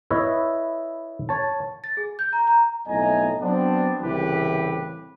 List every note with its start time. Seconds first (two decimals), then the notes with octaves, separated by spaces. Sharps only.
0.11 E4 B4 C#5 D#5 E5
1.29 C#5 A5
1.84 A6
1.97 G#4
2.19 G6
2.33 A#5
2.47 A#5
2.87 B1 F2 A2 D#5 G#5 A#5
3.40 F#3 B3 C4 D4
4.01 C2 A2 C#3 E3 G4 B4